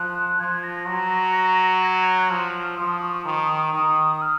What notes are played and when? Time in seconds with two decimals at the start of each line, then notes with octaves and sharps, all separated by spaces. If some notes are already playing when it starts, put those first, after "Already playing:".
Already playing: F3 F#6
0.40 F3 G#6
0.63 A#6
0.87 F#3
1.82 G#6
1.95 A#6
2.07 G#6
2.19 F#6
2.30 F3 F6
2.78 F3 D#6
3.02 C#6
3.26 D#3 D#6
3.73 D#3 D#6
4.22 F6